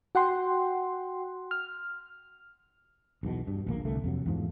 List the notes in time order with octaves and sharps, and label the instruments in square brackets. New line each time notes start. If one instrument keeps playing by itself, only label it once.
[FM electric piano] F#4 F#5 G5 C6
F6
[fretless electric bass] B1 E2 G2 B2
G2
D1 A#1 A#3
C2 D3 A3
F2 C3 F#3
E2 G#2 F3